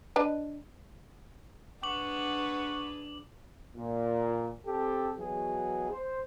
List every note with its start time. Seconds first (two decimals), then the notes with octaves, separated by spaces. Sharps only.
0.16 D4 B4 D#5
1.83 D4 G#4 B4 F#5 C#6 D6 F#7
3.77 A#2
4.67 C4 G4 A4
5.19 B2 E3 F#3 G#4
5.91 C5